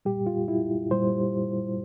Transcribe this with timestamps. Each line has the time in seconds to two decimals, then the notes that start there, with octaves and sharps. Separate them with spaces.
0.05 A#2 G3 G4
0.27 F4
0.48 E4
0.91 A#2 G3 C5